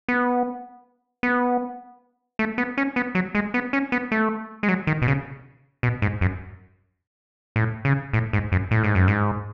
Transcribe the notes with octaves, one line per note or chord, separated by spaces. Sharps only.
B3
B3
A3
B3
C#4
B3
F#3
G#3
B3
C#4
B3
A3
G#3
F#3
D#3
B2
C#3
B2
G#2
F#2
A2
C#3
A2
G#2
F#2
A2
G#2
F#2
G#2